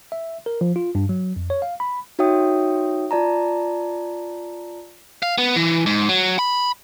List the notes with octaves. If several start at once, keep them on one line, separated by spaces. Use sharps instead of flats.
E5
A#4
F3
F4
G2
F#3
F2
C#5
F5
B5
D#4 F#4 C#5 E5 G5 D#6
F4 D5 A5 A#5
F5
B3
E3
G#2
F#3
B5